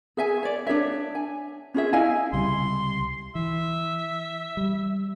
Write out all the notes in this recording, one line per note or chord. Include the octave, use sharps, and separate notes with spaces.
G#4 E5 G#5
C#5 D5
D4 G#4 C#5 E5
G#5
C#4 F4 G#4 E5
E4 D#5 F5 G#5
C#2 C3 G3 C6
E3 E5
G3